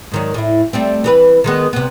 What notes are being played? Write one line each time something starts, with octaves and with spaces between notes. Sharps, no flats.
G#2 D#3 F#3
A2 E4
G3 A3 C4
E3 G4 B4
D#3 G#3 B3
C3 B3